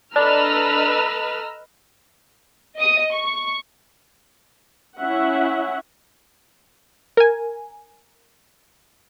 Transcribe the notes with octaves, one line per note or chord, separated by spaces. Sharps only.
D4 A4 B4 D#5 A#5 E6 F6
D#5 D#6
C#6
C#4 E4 E5 F#5
A#4 G#5